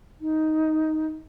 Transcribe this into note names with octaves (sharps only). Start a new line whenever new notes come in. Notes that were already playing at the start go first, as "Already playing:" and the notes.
D#4